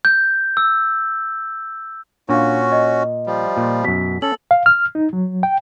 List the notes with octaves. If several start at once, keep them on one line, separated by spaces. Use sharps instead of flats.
G6
E6
A#2 C#4 D4 F#4 F5
D#5
F3 G3
A#2
F#2 B2 B6
C#4 A4 F#7
F5
F6
D#4
F#3
G5